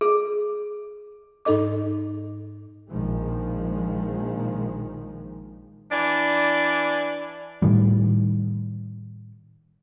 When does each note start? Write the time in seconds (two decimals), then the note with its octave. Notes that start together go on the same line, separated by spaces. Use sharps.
0.01 G#4
1.45 G#2 D#4 A4 D#5 D6
2.90 A#1 D#3 F3 G#3
5.91 E3 D4 D5
7.62 A2 D#3 G3